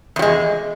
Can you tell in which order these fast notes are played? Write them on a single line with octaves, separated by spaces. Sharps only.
E2 F#3 G#3